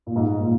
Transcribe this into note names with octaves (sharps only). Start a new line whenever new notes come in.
A#2
G#2
A#2